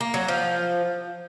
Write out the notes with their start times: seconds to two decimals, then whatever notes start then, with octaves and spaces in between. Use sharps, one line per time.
0.01 A#3
0.14 F#3
0.28 F3